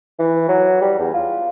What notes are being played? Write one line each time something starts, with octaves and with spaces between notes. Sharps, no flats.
E3
F#3
G3
E2
F4